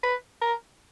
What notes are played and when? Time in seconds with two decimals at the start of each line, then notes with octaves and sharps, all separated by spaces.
0.03 B4
0.41 A#4